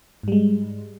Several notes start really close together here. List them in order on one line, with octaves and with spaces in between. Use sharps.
G#2 G3 G#3